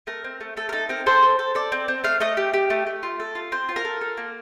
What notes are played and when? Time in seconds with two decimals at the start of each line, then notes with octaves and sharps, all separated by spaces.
0.07 A3 A#4
0.24 C4
0.41 A3
0.57 A3 A4
0.69 A#4
0.73 D#4 A4
0.89 C4 A#4
1.06 A4 C5
1.22 A4
1.39 A4
1.55 A4 D5
1.72 C4
1.88 C4
2.04 A3 F5
2.20 A3 D#5
2.37 G4
2.54 G4
2.70 A3
2.87 A3
3.03 F4
3.20 A4
3.35 F4
3.52 C4 C5
3.69 F4
3.76 A#4
3.85 A4
4.01 A4
4.17 A#3